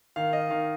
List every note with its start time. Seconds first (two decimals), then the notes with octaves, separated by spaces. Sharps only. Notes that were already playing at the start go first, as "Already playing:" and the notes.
0.16 D#3 F5
0.33 D#5
0.50 D#3 F5